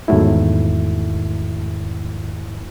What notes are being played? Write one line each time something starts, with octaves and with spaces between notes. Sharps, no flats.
E2 G#2 D#3 F#3 A3 E4